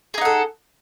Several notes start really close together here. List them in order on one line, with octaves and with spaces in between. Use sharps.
G#4 D#4 F#5 A4